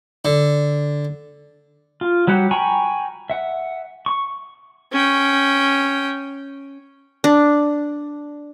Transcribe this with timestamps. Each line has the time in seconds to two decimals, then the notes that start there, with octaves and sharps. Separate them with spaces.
0.25 D3
2.01 F4
2.27 F#3 G3 G4 F#5
2.51 G5 G#5 A#5 B5 C#6
3.30 E5 F#5
4.06 C#6
4.92 C#4 G5
7.24 D4